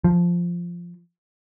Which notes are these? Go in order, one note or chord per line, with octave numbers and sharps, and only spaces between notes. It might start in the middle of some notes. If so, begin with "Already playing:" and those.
F3